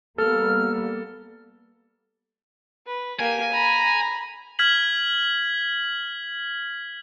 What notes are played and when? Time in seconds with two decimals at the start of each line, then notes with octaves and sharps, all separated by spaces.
0.18 G3 A#3 B3 A4 F6
2.87 B4
3.19 A#3 G4 G#5
3.52 A#5 B5
4.59 F6 G#6 B6 F#7